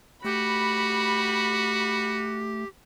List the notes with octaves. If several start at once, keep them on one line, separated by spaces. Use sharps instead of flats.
A3 F#4 G4 B5